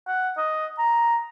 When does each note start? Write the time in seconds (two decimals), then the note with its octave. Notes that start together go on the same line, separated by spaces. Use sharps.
0.07 F#5
0.37 D#5
0.78 A#5